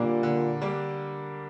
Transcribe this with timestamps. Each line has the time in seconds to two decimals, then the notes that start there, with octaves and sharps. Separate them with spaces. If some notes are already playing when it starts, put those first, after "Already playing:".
Already playing: A#2 D3 G3 A#3 D4
0.23 D3
0.61 G3 A#3 D4